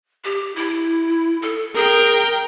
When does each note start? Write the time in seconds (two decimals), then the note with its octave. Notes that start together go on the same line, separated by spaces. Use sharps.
0.24 G4
0.56 E4
1.42 A4
1.75 G#4 A#4 G5